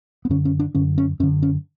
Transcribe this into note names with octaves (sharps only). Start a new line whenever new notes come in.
B3
F#2 D3 C#4
C#4
D4
F#2 D3 C#4
C#4
F#2 D3 C#4
C#4